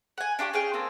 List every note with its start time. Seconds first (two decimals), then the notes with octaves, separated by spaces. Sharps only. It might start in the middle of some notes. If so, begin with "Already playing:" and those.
0.18 F#5 G#5
0.39 D4 F4 G4 C#5
0.54 C#4 G#4 F5 G5
0.73 A#3 C4 G#4 A4